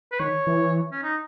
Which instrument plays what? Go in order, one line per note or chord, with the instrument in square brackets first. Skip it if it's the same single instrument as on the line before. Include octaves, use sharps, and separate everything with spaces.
[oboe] B4
[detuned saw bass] D#3 [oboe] C#5
[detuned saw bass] E3
[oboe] C#4
D#4